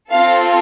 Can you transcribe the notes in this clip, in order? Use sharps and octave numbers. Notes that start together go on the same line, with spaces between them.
C4 F4 A4 F5